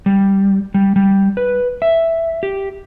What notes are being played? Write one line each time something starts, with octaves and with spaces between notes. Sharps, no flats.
G3
G3
G3
B4
E5
G4